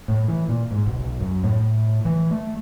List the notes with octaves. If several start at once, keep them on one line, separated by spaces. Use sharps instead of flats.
A2
E3
A#2
G#2
B1
B1
F#2
A2
E3
A3